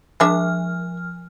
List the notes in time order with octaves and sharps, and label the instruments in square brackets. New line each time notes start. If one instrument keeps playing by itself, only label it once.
[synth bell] F3 F6 [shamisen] G#3 D4 E5